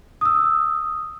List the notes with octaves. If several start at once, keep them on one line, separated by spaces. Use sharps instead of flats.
D#6 E6